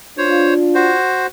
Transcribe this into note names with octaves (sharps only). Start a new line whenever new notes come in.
D4 F4 C5 C#5
F#4 C5